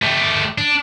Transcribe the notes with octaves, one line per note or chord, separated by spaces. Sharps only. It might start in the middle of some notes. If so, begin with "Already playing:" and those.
A3 G4
D4